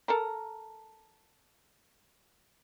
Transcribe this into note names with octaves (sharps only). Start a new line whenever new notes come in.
A4 A#4 A#5